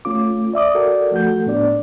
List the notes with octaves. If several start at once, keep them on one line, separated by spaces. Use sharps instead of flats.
A3 C#4 F4 D6
D5 E5 D6 D#6
F#4 A4 A#4 D5
F3 A3 F#4 A4 G6
A2 B3 D4 D5